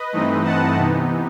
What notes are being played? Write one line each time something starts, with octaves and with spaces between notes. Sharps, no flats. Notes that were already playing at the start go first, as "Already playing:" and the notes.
Already playing: B4 D#5
G2 E3 A3 C4 D#4
F#5 A5
C3 E3 B3 D#4